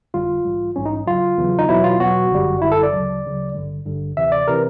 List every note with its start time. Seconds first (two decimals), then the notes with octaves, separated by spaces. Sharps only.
0.14 G1 F2 D3 G3 F4
0.45 A#1 G#2 E3 G3
0.76 A#1 G#2 E3 G3 C#4
0.86 D#4
1.06 E2 C#3 F#3 F4
1.38 E2 C#3 F#3
1.58 D#4
1.69 E2 B2 F#3 E4
1.84 F4
2.00 E2 B2 F#3 F#4
2.31 G1 F#2 D3 G3
2.62 G1 F#2 D3 G3 E4
2.72 A4
2.83 D5
2.93 D2 C#3 F#3
3.24 D2 C#3 F#3
3.55 G#1 G2 D3 G3
3.86 G#1 G2 D3 G3
4.17 D2 C3 E3 E5
4.32 D5
4.48 C3 E3 A#4